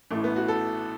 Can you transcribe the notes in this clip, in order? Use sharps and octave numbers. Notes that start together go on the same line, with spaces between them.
A1 A2 E3 A3
B3
F#4
A4